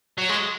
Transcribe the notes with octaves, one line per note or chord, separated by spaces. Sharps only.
F#3
G#3